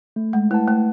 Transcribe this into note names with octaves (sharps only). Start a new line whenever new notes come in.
A3
G#3
A3 E4 B4 F#5 A5
A3